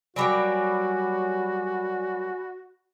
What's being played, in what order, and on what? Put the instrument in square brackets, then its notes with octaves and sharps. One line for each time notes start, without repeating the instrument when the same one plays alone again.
[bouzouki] F#3 G3 A#3 [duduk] F#4 [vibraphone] D5 G#5 B5